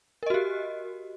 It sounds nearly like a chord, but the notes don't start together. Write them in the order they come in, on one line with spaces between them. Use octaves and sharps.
A#4 D#5 F#4 G4